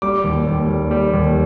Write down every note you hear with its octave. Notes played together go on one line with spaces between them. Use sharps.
G3 D6
D#2
D#2
G3
G3
D#2